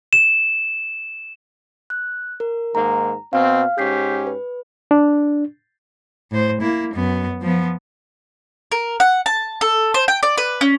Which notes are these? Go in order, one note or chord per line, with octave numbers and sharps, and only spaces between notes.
E7
F#6
A#4
G#2 D#3 A#3 A#5
B2 C4 F5 F6
G#2 C#4 G4 G6 B6 C7
B4
D4
A2 C5
A#3 E4
F#2 B3
F3 B3
A#4
F#5
A5
A4
C5
G5
D5
B4
C#4